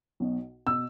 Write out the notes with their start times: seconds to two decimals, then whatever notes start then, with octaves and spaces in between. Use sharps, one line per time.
0.20 B1 B2
0.66 B2 E6